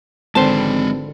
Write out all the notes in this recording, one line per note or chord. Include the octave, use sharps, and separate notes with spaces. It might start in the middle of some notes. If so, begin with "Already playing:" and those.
G#1 D3 G#3 C4 B4 C5 D5 A5